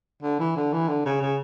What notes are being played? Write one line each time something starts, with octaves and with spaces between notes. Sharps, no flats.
D3
E3
D3
E3
D3
C#3
C#3